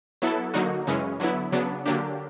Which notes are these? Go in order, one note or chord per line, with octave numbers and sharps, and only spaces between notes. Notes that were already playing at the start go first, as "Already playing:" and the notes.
F#3 B3 E4 A4
D3 F#3 A#3 D#4 F#4
F#2 C#3 E3 G#3 C#4
D3 F#3 B3 E4
C#3 F#3 B3 D4
D3 F#3 A#3 D4 G4